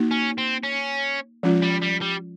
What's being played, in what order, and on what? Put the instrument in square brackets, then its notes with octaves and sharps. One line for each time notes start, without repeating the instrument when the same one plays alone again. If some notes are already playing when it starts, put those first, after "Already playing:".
Already playing: [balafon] A#3 D#4 F#4
[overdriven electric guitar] C#4
C4
C#4
[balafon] F3 G#3 C#4 F4
[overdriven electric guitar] G3
G3
G3